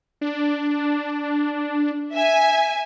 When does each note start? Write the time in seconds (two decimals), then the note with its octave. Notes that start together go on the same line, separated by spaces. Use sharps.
0.21 D4
2.13 E5 G#5